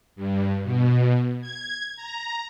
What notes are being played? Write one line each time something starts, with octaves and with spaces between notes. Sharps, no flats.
G2
B2
G#6
A#5